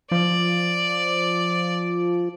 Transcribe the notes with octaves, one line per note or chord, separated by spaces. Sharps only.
F3 D5